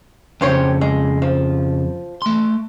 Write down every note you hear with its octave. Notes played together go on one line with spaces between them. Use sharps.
F2 C#3 G4 C5 C#5
G#3
F3
A3 C6